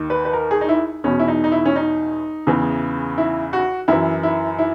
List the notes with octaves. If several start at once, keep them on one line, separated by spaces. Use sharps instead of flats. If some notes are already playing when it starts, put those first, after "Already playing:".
Already playing: D#2 D#3
B4
B4
A#4
G#4
D#4
E4
E2 B2 C#4
E4
D#4
D#4
E4
C#4
D#4
E2 C#3 E3
E4
F#4
F#2 E3 E4
E4
E4